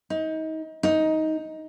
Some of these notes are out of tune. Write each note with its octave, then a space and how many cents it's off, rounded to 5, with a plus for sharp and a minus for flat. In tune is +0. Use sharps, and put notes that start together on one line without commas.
D#4 +30
D#4 +15